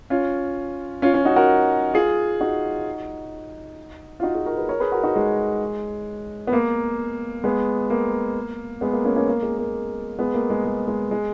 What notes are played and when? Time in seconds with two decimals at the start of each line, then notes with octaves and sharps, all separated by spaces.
0.10 C#4 F4
1.02 C#4 F4
1.14 C#4 F4
1.25 D#4 F#4
1.36 F#4 A#4
1.94 F4 G#4
2.41 D#4 F#4
4.20 F4
4.23 D#4 F#4
4.35 F4 G#4
4.46 F#4 A#4
4.57 G#4 B4
4.69 A#4 C#5
4.80 G#4 B4
4.92 F#4 A#4
5.03 D#4 F#4
5.16 G#3
6.47 B3
6.53 A#3
7.44 G#3 B3
7.90 A#3
8.81 G#3 B3
8.93 A#3
9.04 A#3 C#4
9.16 A#3 C#4
9.28 A#3
9.42 G#3
9.58 A#3
10.19 G#3 B3
10.34 A#3
10.50 G#3
10.65 G#3
10.87 G#3
11.11 G#3